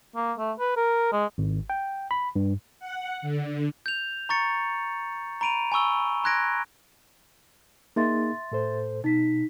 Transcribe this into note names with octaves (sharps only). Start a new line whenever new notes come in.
A#3
A3
B4
A#4
G#3
G#1
G5
B5
G2
F#5
D3
G6 F7
A#5 C#6 A6 C#7
A#5 B5 D7 D#7 F7
G#5 B5 C#6 E6 G7
A#5 C6 F#6 G#6 A#6 D7
A#3 D#4 G#4 E5 C6 A6
A2 A4 C5
B2 D#4 B6